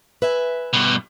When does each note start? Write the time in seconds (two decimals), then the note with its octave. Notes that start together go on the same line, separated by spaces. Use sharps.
0.22 B4 E5 G#5
0.73 G2 B2